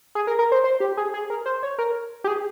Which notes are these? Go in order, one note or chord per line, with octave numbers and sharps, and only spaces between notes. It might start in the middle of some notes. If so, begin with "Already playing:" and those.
G#4
A#4
A#4
C5
C5
G4
G#4
G#4
A#4
C5
C#5
A#4
G4
G#4